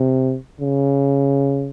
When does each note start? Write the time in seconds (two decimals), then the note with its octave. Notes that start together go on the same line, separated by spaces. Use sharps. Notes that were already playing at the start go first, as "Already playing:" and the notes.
Already playing: C3
0.60 C#3